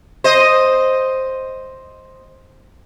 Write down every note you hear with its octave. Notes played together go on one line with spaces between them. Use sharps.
C5 D#5